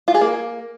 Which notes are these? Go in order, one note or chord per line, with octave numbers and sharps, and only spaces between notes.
F4
G#4
A#3